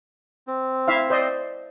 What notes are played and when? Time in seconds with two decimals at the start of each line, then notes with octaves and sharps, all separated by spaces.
0.47 C4
0.88 E4 E5 F5
1.10 C5 D5 D#5